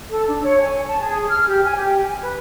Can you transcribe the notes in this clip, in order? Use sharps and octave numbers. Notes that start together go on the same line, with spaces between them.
A4
D4
C#5
G#5
A5
G#4
F6
G4
G#5
G4
G#5
B4